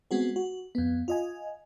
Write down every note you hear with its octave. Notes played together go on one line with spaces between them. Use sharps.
G#3 B3 C4 F#4 G#4
F#4
F2 B3
F4 D#5 G#5